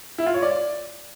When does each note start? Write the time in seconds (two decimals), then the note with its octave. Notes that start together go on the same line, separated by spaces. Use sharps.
0.18 E4
0.26 F4
0.34 C#5
0.42 D5